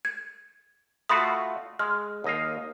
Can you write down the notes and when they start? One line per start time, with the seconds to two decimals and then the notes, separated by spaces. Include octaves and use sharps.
0.05 G#6
1.09 A3 F4 F#4 B5 C6 D#6
1.79 G#3 F6
2.24 D#2 D#5 F5